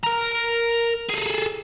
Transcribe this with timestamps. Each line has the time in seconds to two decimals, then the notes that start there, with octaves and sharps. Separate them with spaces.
0.03 A#4 A#5
1.09 G#4 A4